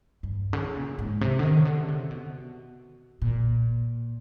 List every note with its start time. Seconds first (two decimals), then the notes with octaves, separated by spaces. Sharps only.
0.23 G2
0.53 C#3
0.76 A#2
0.99 G#2
1.21 C3
1.39 D3
1.43 D#3
1.57 C#3
1.65 D3
1.88 C3
2.11 B2
3.22 A#2